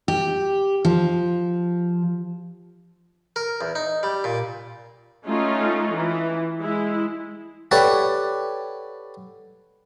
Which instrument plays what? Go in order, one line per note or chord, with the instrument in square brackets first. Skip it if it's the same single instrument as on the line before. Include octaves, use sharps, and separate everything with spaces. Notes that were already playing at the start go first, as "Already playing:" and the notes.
[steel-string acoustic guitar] G4
F3
[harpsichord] A#4
E2
D#4
G3
A#2
[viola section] A3 C#4 D#4 F4
E3
G#3 E4
[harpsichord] G4 A4 B4 C#5 D5 F#5